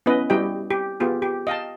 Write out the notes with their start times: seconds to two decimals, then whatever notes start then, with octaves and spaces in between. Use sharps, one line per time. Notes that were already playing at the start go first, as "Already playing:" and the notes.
0.06 B3 C#4 E4 B4 D#5
0.30 G3 E4 F#4 G4 D#5 G5
0.71 G4
1.00 B3 F4 G4 G#4
1.22 G4
1.47 D#5 F5 G5 A5